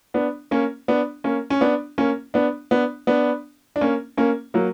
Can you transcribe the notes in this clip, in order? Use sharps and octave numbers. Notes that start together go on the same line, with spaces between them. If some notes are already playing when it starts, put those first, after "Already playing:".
B3 D4
A#3 C#4
B3 D4
A#3 C#4
C#4
B3 D4
A#3 C#4
B3 D4
B3 D4
B3 D4
D4
A#3 C#4
A#3 C#4
F#3 A#3